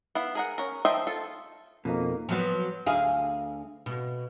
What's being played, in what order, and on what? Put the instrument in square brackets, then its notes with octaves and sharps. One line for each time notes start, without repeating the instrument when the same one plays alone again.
[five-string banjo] B3 E4 F5
G#4 A#4 F#5
C#4 A#4
F3 C5 D#5 E5 G5
F4 A4
[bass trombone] F2 [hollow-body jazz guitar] B2 D#4 [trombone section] A#3
[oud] F3 F#3 B3
D2 G#4 F5
B2